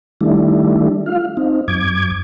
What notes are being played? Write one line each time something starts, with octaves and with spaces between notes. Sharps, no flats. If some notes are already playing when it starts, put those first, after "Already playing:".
D#3 G3 A3 D4 E4
F4 F5
C4 D#4
F#2 D6 G#6